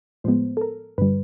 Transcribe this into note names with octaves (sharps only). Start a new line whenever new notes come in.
A2 F3 G#3 B3 C5
A4
A#4
G2 D3 G3 B4